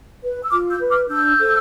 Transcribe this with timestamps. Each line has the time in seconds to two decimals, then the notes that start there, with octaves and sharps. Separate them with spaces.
0.22 B4
0.43 E6
0.51 F4 D6 F6
0.71 E6 G6
0.81 B4
0.90 D6 F6
1.10 D4 E6 G6
1.39 A4 C5